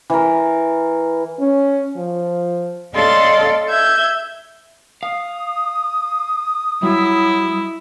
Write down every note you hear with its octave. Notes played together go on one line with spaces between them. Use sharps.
E3 A#4
C#4
F3
C#4 A4 D5 D#5 F5 C6
E5 G6 G#6
F5 D#6
F#3 G3 E4